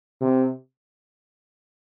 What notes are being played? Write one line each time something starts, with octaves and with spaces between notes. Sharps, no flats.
C3